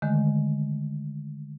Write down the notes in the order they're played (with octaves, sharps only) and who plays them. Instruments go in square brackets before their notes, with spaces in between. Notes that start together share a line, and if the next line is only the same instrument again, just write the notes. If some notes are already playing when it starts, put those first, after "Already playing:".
[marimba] D3 D#3 G#3 A3